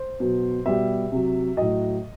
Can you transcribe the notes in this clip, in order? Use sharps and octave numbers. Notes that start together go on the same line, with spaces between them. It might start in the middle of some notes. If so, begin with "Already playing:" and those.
Already playing: C5
B2 F#3
B2 G3 E5
C3 F#3
A2 F#3 D#5